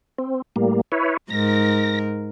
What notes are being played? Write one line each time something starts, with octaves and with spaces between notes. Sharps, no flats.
C4
A2 G3 A#3
E4 B4 C#5
G#2 A#4 A#6